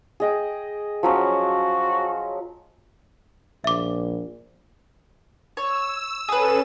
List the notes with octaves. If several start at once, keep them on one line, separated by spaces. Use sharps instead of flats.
G#4 D#5 G5
F3 F#3 C#4 F#4
A#1 E5 D6
C#5 E6
C#4 G#4 A4 B4 E7